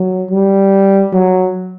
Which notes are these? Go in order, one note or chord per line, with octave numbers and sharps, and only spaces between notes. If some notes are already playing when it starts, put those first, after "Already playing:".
Already playing: F#3
G3
F#3